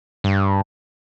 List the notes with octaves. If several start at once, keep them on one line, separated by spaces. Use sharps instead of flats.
G2